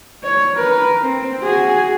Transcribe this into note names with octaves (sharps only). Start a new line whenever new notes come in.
C#5
A#4 B4
C4
F#4 G#4